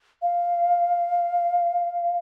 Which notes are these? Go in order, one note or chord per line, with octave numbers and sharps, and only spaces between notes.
F5